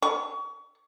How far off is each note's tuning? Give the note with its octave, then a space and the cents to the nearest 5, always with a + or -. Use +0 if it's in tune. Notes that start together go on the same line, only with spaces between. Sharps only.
C#6 +30